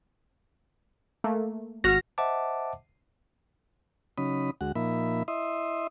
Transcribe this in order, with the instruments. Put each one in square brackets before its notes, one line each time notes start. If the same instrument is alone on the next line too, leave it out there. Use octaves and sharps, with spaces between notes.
[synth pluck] A3 A#3
[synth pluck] G#1 F#4 F6 [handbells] A#6
[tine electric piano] C5 D#5 E5 F#5 A5 D6
[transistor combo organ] C#3 F#3 C#4 D#4 B5 D#6
D2 G#3 F#4 F#5
A#2 F3 A#3 D#4 E5 B5
E4 D#5 E5 C6 D#6